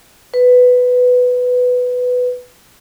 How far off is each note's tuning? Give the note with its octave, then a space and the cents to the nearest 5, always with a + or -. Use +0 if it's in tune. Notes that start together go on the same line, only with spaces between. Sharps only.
B4 +10